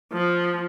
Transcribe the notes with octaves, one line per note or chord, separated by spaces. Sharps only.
F3